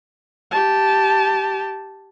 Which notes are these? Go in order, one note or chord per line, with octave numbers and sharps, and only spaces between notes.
G4 A5